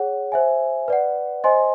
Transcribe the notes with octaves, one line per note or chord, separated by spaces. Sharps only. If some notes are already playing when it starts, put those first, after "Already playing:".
Already playing: G#4 C#5 F#5
C5 E5 G#5
B4 D5 F#5
C5 D#5 G#5 C6